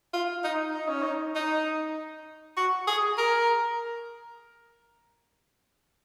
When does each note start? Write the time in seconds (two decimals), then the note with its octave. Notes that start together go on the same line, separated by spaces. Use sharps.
0.13 F4
0.44 D#4
0.74 D#4
0.88 C#4
1.02 D#4
1.35 D#4
2.57 F#4
2.87 G#4
3.18 A#4